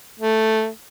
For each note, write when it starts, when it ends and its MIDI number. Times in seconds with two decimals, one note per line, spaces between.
0.20 0.68 57